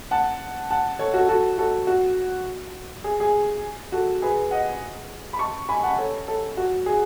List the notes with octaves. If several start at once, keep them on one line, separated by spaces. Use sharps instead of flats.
F#5 A5
F#5 A5
A4 C#5
F#4 A4
F#4 A4
F#4 A4
F#4
G#4
G#4
F#4 A4
G#4 B4
D#5 F#5
B5
A5 C#6
G#5 B5
F#5 A5
A4 C#5
A4 C#5
F#4
G#4